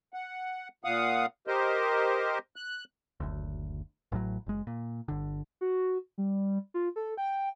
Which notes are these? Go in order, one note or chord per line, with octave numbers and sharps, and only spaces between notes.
F#5
A#2 F5 F#5 D#6
G4 A#4 C5 D#5
F#6
F#1 D2
A1 A2 F3 F#3
F#1 G#3
A#2
G1 D3
F#4
G3
F4
A4
G5